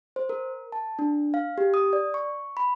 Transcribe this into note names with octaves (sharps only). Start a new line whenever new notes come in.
C5
A#4
A5
D4
F5
G4
D#6
D5
C#6
B5